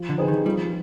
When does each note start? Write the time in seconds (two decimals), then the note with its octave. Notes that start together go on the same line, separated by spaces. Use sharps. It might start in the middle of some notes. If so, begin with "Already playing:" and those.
Already playing: F3
0.09 D3
0.18 C4 D#4 G#4 B4
0.28 D#3
0.46 F3 G3